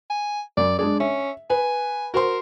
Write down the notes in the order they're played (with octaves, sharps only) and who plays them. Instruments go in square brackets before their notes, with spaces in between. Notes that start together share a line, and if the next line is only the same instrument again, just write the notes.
[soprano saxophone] G#5
[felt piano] F#2 [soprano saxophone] D5
[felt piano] G#3 D4 G#4 [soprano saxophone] D5
[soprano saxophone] C#4 [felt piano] E5
[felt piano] B4 [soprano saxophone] G#5
[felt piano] F#4 C5 C6 [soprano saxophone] A#4